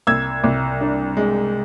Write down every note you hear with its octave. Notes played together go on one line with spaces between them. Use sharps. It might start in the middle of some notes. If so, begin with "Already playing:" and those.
C2 E6 G#6
C2
D4
G#3